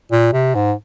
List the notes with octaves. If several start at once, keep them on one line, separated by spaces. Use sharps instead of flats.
A#2
C3
G#2